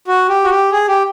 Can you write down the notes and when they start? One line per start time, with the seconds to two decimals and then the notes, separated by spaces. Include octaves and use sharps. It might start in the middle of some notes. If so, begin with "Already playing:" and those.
0.07 F#4
0.29 G4
0.44 F#4
0.50 G4
0.72 G#4
0.88 G4